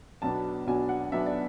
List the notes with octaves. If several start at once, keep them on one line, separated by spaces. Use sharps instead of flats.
B1 B2 F#3 B3 D4 A5
B1 B2 F#3 B3 D4 G#5
F#5
B1 B2 F#3 B3 D4 E5
D5